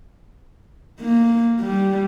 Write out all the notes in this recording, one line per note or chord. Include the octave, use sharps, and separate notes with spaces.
A#3
G3